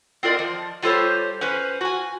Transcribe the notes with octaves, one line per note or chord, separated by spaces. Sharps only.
C4 F4 A#4 D5 D#5
F3
G3 F4 G4 A4 C5 C#5
C#4 B4 C5
F#4 G#5